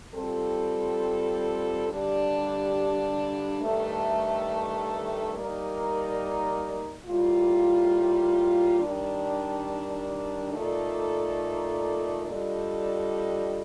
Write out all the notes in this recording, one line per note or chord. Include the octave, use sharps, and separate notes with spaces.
G3 C4 F4 A4
G2 D3 G3 D4 G4
G2 D#3 A3
G3 A#3 D#4 A#4 D5
A2 G3 A#3 F4
D#3 G3 D4
A#2 A3 D#4 A4 D5
G3 D4 F4 A4 D#5